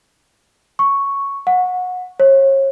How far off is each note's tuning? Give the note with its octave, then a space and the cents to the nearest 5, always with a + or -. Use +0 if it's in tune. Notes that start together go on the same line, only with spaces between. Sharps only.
C#6 +0
F#5 -25
C#5 -35